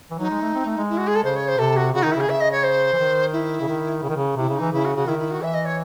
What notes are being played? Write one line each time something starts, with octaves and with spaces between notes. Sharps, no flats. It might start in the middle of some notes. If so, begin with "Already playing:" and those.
E3
F#3 D#4
G#3
A3
C4
A3
G#3
E4
F#4
G#4
A4
C#3 C5
C#5
C5
C3 A4
F#4
C#3 F#4
D#3 D#4
E4
C#3
G#4
C#3 E5
D#5
C#5
C5
E3
D#3
E4
C#3
D#3
C#3
D#3
C#3
C3 E4
C#3
D#4
E3
C#3 E4
F#4
C#3 F#4
D#3 E4
E4
F#4
E3 E5
D#5
C#5